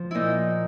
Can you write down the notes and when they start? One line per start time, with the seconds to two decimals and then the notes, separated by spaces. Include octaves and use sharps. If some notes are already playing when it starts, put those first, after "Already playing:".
Already playing: F3
0.11 A#2 D#4 E4